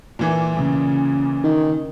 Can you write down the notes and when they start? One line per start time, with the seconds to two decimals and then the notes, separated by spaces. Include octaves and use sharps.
0.19 A#2 E3 A#3
0.54 C#3
1.44 D#3